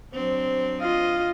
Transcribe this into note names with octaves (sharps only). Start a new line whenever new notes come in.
F#3 C4 D4 C5
F4 D#5 F5